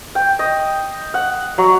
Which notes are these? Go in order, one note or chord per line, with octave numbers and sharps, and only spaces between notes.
G5
D#5
F#5
F#3